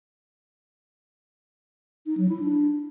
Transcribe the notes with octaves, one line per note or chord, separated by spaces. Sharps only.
D#4
F#3
E4
D4